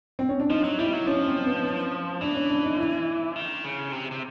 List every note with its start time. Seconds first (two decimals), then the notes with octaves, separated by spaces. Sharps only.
0.19 C4
0.29 C#4
0.40 D4
0.50 F3 D#4
0.64 F#3
0.79 G3 E4
0.93 F#3
1.07 F3 C#4
1.26 C4
1.46 B3
1.64 C#4
2.21 E3 D4
2.35 C#4
2.49 D4
2.64 D#4
2.78 E4
3.36 D#3
3.64 C#3
3.92 C3
4.11 C3